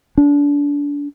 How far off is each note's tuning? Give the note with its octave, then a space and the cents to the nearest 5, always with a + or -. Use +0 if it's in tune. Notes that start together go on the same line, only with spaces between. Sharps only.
D4 -30